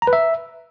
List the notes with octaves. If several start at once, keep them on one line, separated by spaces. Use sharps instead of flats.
A#5
B4
E5